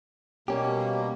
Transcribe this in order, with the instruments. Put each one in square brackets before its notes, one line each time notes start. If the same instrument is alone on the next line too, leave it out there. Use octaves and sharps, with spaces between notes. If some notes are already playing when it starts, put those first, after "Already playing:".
[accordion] B2 A#3 [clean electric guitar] G3 C#4 G4